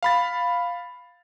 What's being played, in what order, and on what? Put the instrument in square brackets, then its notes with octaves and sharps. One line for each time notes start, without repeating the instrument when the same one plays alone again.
[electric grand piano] F5 B5 A6